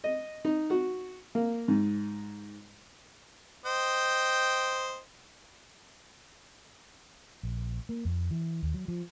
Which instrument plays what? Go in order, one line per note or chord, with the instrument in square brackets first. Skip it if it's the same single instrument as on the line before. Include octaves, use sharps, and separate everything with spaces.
[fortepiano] D#5
D#4
F#4
A#3
G#2
[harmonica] C5 D#5 G5
[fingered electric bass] A#1
A#3
F2
E3
D#2
F#3
F3